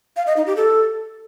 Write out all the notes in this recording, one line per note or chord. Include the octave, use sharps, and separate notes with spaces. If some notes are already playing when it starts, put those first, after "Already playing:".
F5
D#5
D#4
G4
A4